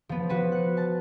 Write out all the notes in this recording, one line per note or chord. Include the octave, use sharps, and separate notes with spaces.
F3 B3
F3 F#4 B4
F#6 C#7
A5